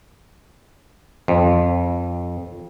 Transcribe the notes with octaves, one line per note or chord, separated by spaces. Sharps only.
F2